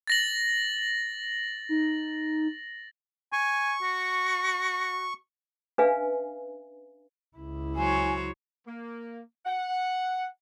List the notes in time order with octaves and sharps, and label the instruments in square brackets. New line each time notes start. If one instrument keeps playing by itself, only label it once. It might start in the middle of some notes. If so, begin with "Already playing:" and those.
[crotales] A6 A#6 F#7
[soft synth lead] D#4
[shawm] G#5 [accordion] C#6
[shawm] F#4
[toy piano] C#4 D4 B4 E5 F5 G#5
[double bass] C#2 E4
[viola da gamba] F#3 C5 C#5 [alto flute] G#5
[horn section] A#3
F#5